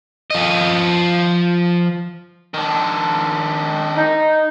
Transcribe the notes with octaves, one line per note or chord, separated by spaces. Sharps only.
F3 D#5
D#3 D4
D#4